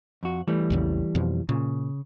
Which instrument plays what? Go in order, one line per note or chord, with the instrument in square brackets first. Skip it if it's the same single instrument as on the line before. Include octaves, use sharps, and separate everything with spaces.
[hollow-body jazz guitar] F2 F#4
E3 G3 A3
[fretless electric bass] A#1 E2 C#3
F2 B2 F3
[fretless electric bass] A#2 [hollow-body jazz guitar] C#3